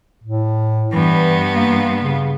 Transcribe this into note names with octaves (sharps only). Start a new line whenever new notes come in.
A2
G2 E3 B3
A#3
C#3